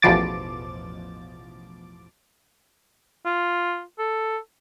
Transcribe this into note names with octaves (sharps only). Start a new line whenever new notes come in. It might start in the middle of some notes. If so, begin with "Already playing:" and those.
A1 E2 B2 F3 D6 A6
F4
A4